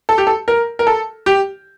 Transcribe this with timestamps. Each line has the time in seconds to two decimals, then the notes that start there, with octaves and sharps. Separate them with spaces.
0.09 A4
0.18 G4
0.27 A4
0.48 A#4
0.79 A#4
0.87 A4
1.26 G4